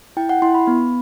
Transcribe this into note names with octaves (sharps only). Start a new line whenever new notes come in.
E4 G5
F#5
E4 C6
B5
B3